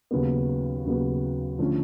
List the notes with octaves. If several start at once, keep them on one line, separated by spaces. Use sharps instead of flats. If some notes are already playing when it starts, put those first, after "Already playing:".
D#2 C#3 F#3 B3
D#2 C#3 F#3 B3
D3 F3 A3 C#4